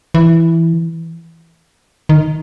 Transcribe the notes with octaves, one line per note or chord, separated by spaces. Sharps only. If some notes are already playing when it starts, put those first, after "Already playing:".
E3
D#3